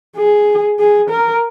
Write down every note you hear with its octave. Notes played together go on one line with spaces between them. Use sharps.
G#4
G#4
A#4